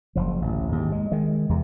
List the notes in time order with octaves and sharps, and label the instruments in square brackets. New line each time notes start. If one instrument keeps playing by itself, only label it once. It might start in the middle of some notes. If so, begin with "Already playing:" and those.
[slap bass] F#1 F3
A1 D2
D#2 G#2
G#3
D#3 G#3
E2 C3